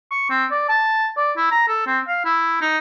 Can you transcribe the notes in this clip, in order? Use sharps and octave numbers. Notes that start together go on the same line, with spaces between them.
C#6
C4
D5
A5
D5
E4
A#5
A4
C4
F5
E4
D#4